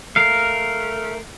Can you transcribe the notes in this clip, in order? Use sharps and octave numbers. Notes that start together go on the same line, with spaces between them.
A3 A#4 F5